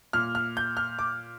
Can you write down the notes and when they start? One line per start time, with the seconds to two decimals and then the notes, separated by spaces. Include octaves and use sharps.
0.13 A#2 F6
0.35 F6
0.57 G6
0.77 F6
0.99 D6